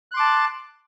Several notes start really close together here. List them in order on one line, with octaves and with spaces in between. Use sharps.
F#6 C6 D6 A5